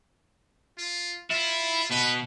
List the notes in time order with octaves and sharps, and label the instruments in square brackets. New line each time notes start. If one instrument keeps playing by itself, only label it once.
[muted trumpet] F4
[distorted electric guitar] E4 [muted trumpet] F4
[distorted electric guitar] B2 [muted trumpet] B4